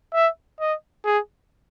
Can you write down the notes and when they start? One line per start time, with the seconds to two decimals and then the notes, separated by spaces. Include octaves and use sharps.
0.14 E5
0.60 D#5
1.05 G#4